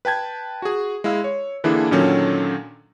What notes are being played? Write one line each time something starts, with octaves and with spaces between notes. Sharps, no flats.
B4 G5 A5 G#6
F#4 G#4
G#3 E4 F5 E6
C#5
D3 E3 A#3 D4 E4 G#4
A#2 D3 D#3 F#3 C#4 A4